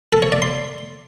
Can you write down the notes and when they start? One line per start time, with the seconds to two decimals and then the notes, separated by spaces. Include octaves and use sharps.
0.13 A4
0.22 C#5
0.32 D5
0.42 C6